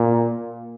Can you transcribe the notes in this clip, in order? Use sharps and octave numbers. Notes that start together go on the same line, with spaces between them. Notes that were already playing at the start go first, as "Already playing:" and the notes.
Already playing: A#2